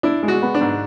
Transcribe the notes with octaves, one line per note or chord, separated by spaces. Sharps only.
D4 E4
G#3
F#4
B3
D4
G#2